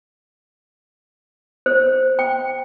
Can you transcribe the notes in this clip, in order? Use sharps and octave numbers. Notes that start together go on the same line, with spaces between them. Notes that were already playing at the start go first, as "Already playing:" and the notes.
C5
G5